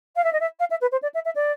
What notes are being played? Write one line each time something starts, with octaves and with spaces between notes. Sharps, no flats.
F5
E5
D#5
E5
F5
E5
B4
C5
D5
E5
E5
D5